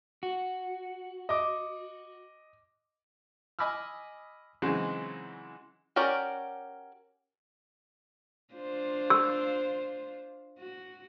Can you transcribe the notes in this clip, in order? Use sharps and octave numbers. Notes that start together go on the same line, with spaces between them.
F#4
D#5 D6
D#5 G#5 B5 D6 E6 F6
C#3 E3 F#3 G#3 C4 D#4
C#4 F#4 G4 A#4 D5
D4 F4 C5
E6
F#4